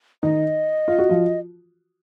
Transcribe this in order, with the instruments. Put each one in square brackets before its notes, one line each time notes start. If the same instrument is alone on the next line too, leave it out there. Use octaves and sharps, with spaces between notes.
[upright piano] D#3 D#4 [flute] D#5
[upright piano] F4
F#4
F3 F4